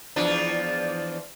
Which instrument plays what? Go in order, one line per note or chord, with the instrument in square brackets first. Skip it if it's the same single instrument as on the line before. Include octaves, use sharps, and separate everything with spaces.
[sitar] E2 F3 D4